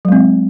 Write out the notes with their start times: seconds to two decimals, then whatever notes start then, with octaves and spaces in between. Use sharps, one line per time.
0.05 F#3
0.08 G#3
0.12 C4